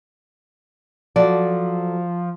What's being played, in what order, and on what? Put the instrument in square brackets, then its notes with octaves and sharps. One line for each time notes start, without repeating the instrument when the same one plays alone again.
[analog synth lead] F3 [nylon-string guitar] F#3 A4 D5